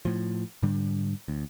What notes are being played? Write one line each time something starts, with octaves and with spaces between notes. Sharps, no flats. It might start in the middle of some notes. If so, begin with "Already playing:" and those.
A2 F3
G#2 D3 G3 D4
D2